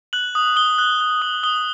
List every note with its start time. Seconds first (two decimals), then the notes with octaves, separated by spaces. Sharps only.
0.13 F#6 F#7
0.35 D#6
0.56 D#6 G7
0.79 F#6
1.01 F#6
1.22 D#6 F#7
1.43 D#6 G7